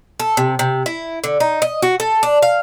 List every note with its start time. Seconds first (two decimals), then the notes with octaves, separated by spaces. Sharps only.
0.20 A4
0.37 C3
0.59 C3
0.86 E4
1.24 D3
1.40 D#4
1.62 D#5
1.82 F#4
2.00 A4
2.23 D4
2.42 F5